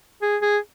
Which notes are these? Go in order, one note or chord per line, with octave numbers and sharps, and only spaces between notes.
G#4
G#4